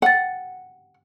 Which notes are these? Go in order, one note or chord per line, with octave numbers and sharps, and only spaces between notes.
F#5 G5 A6